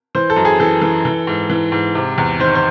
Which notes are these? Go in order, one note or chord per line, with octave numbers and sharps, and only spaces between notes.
E3 C5
A4
F#2
G#4
E3 A4
E3
E3
G#2
E3
G#2
C3
E2
D#3 C5
C5